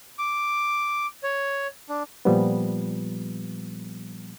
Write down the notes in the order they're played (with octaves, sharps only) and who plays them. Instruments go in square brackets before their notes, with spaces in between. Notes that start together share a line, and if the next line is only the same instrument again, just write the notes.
[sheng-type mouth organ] D6
C#5
D4
[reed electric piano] A#2 F3 G3 B3